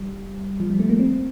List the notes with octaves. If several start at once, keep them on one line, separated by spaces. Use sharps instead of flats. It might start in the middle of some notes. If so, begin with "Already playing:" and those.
Already playing: G3
F3
G3
A3
A#3
C4